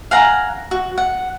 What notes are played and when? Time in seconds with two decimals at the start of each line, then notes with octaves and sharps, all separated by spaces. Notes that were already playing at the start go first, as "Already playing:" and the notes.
0.11 F5 F#5 G#5 A#5
0.71 F#4
0.98 F#5